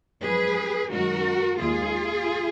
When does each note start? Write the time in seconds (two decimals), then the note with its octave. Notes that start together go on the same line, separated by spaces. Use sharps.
0.22 F#2 F3 G#3 G#4 B4
0.91 F#2 D#3 G#3 F#4 A#4
1.60 D#2 D#3 G#3 F4 G#4